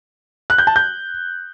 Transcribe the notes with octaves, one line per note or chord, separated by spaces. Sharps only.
F#6
G6
A5
G6